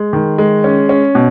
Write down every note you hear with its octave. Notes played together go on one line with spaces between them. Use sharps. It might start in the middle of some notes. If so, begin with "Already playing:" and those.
Already playing: G#3
D#3
G#3
C#4
C#4
B2